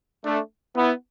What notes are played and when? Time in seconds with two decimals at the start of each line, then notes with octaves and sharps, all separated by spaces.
0.24 A3 D4
0.76 B3 E4